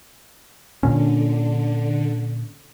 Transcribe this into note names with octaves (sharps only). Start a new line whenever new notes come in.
A#2 D3 C#4